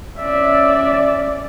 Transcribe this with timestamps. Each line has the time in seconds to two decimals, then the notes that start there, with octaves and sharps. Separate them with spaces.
0.17 C#4 D5 E5